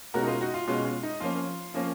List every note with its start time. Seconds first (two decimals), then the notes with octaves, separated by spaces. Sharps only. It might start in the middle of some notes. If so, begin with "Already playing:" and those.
0.14 B2 G#3 C#4 F#4 A#4
0.23 D#4
0.28 F4
0.41 D#4 F#4
0.54 F4
0.67 B2 G#3 C#4 F4
0.85 F4
1.03 D#4
1.20 F3 A#3 C#4 F4
1.74 F3 A#3 C#4